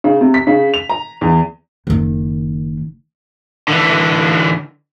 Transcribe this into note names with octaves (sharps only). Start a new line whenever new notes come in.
C#3
C3
B6
C#3
F7
A#5
E2
F#1 D#3
D3 E3